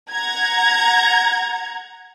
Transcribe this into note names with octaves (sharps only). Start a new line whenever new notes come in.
F#5 A#5 G#6